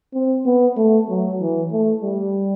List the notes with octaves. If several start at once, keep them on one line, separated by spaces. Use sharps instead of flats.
C4
B3
A3
F#3
E3
A3
G3